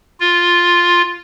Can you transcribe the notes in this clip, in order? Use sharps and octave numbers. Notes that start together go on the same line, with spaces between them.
F4